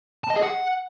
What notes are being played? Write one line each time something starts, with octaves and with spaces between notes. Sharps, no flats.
A5
D#5
G#4
F#5